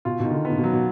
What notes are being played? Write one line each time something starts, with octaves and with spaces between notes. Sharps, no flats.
B2 F4
B2 D#3
D3
A#2 B3
B2
F#3
B2